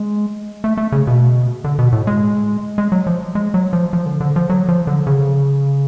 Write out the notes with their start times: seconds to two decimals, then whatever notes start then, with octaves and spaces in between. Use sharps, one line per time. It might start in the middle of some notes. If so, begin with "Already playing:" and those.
Already playing: G#3
0.64 A3
0.77 A3
0.92 C#3
1.07 B2
1.64 D3
1.79 B2
1.92 A2
2.07 G#3
2.78 G#3
2.92 F#3
3.07 F3
3.35 G#3
3.54 F#3
3.73 F3
3.93 F3
4.06 D3
4.20 D3
4.36 F3
4.50 F#3
4.69 F3
4.87 D3
5.07 C#3